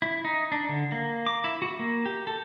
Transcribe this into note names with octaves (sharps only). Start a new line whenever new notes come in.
E4
D#4
D4
D3
A#3
D6
E4
F#4
A#3
G4
A4